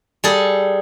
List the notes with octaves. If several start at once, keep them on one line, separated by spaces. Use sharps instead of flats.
G3 G#4 A4